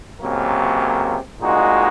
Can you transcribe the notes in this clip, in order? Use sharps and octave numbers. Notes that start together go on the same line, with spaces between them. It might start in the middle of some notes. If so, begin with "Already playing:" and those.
C#2 C3 F#3 A#3
C2 A#2 G#3 D#4 F#4